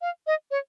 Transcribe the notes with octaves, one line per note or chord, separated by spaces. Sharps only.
F5
D#5
C#5